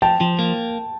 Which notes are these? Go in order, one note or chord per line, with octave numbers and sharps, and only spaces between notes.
F3 G5 A5
F3
A#3